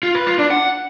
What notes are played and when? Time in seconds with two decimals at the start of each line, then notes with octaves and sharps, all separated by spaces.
0.03 F4
0.15 B4
0.27 F4
0.39 D4
0.50 F#5